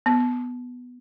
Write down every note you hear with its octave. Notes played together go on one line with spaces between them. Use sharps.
B3